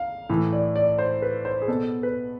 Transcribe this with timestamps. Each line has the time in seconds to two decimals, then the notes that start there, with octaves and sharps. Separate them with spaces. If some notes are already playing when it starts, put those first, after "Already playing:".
Already playing: F5
0.29 A2 E3
0.53 D5
0.76 D5
0.98 C5
1.22 B4
1.45 C5
1.62 G#4
1.68 B2 A4
2.03 B4